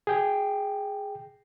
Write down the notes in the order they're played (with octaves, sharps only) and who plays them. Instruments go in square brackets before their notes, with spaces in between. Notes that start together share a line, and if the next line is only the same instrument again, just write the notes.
[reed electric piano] G#4 G5